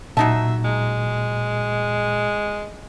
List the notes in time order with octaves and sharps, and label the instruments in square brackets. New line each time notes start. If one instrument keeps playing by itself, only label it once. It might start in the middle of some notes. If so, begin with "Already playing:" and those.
[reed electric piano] A#2 [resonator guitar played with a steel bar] F#3 D#4 A5 [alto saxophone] E5
[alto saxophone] G#3